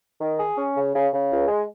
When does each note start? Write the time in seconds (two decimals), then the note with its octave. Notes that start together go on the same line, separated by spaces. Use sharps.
0.20 D#3
0.38 G#4
0.57 C#4
0.74 C#3
0.94 C#3
1.11 C#3
1.31 C#2
1.48 G#3